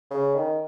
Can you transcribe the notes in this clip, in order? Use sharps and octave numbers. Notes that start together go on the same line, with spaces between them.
C#3
D#3